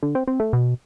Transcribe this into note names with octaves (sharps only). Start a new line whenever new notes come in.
D3
C4
C4
A3
B2